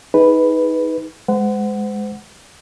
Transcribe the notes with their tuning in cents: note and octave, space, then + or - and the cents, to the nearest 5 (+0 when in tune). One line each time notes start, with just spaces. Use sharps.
D#4 +25 G#4 +0 B4 +0
G#3 +0 C5 -40 F#5 +5